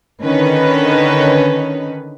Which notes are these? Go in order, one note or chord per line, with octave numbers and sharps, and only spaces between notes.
D3 D#3 C#4 B4